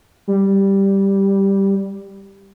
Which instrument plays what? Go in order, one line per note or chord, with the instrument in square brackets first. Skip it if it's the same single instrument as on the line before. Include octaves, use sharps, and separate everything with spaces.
[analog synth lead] G3